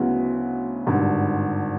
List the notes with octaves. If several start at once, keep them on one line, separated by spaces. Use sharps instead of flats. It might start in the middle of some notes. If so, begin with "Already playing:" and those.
Already playing: D2 C#3 F#3 B3 E4
G#1 G2 D3